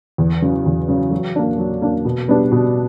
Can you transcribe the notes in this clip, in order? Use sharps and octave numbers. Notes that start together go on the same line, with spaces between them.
E2
C#3 F#3
E2
C#3 F#3
F#3
A#3 D4
F#3
A#3 D4
B2
G3 B3 D4
B2